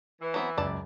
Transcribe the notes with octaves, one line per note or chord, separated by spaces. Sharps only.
E3
F#3 B3 C4
C#2 F#2 D5 A5